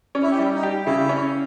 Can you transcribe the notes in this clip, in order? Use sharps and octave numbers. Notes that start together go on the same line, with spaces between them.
C#4
E4
G4
G3 E4
D#4
G4
C#3 E4
C#4